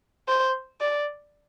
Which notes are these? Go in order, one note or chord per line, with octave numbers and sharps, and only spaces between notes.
C5
D5